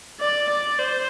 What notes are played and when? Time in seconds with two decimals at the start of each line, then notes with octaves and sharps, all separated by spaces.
0.20 D5
0.49 D5
0.78 C5